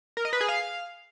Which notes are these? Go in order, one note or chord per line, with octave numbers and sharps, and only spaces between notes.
A#4
D#5
B4
G#4
F5